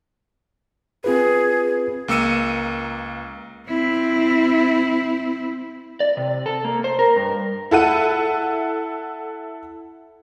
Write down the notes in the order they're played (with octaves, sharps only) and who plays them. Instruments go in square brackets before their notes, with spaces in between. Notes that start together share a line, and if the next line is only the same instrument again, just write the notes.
[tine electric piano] C4 F4 B4 [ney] G#4
[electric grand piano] C#2 A#3 E6 C#7 D#7
[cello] C4 E4
[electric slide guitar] D5
C3
A4
A#3
C5
A#4
G2
[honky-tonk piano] E4 A4 F#5 D#7